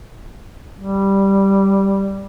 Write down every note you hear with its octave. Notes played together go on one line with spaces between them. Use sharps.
G3